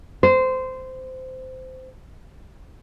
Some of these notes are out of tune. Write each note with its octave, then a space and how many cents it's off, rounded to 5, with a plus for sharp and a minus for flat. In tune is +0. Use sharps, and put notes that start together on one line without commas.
C5 -15